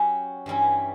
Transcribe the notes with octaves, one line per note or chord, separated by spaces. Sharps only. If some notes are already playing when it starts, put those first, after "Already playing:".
Already playing: F#3 C#4 G4
G2 E3 G3 C#4 E4